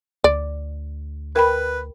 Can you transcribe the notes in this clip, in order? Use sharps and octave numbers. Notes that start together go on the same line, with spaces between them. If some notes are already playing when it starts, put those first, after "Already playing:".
D2 D5
A#4 B4 G5 B5